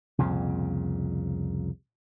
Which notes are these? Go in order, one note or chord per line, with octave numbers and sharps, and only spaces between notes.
C2 F2 A#2 C#3